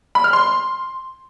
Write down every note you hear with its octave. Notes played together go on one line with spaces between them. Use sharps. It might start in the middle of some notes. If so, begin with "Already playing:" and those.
B5
F6
C6